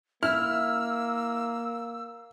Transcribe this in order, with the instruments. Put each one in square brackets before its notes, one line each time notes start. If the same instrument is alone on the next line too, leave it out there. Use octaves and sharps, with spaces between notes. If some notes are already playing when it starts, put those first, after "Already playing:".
[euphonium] A#3 [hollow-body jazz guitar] E4 [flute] E6 [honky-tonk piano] F6